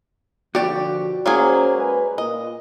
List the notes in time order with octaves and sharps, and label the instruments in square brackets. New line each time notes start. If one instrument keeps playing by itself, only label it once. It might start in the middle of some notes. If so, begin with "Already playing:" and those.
[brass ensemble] B2 D3 F3 [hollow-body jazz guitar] F#4 D5 G5 [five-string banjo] G4
[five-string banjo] F#3 A#3 G#4 [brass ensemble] C#4 C5
[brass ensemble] G#3 B4 G#5
[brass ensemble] A#2 [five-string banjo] D#5